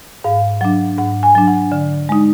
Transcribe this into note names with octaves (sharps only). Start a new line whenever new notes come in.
G#2 F5
F#3 D4 F#5
G#2 F#5
G#5
F#3 D4
F#5
D3
G#3 D#4